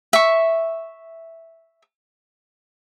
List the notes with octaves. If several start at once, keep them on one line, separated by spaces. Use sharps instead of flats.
E5 C#6